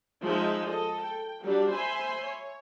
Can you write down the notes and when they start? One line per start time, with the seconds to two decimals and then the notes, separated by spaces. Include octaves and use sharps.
0.22 F3 G#3 D#4 E5
0.67 A4 D#5
1.00 G5
1.43 F#3 G3 D4 F#4 G4
1.72 C5 E5 G#5 B5 C6
2.26 C#5